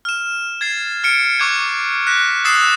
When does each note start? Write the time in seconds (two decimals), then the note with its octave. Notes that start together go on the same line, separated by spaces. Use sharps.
0.05 F6 E7
0.61 G#6 A6 C7
1.04 F6 C#7 D7
1.39 C#6 D6 F#6 G#6 D#7
2.07 F#6 A#6 B6 E7
2.44 D#6 E6 A6 C7 E7